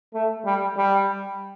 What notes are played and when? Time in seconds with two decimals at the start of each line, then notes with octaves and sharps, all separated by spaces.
0.14 A3
0.46 G3
0.77 G3